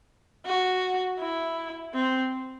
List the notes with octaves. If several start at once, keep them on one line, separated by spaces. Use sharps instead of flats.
F#4
E4
C4